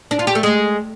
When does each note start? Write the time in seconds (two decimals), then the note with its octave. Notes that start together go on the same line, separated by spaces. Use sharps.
0.11 D4
0.19 F4
0.27 G4
0.35 A3
0.43 G#3